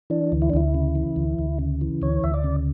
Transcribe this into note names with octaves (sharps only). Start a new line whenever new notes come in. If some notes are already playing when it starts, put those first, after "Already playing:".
E3 D4
D2
E4
D4
D2 E4
C#3
E3
D2
D2
C#3
E3
D2 C#5
D2 E5
D5
C#3